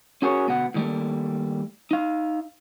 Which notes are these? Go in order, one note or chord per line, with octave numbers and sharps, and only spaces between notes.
C#4 F#4 G#4 A#4 C5 C#5
D2 B2 B3 F#5
A2 D#3 G3 A3 A#3
D#4 F5